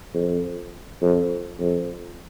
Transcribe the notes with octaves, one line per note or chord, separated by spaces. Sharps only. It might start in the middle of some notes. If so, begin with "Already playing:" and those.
F2
F2
F2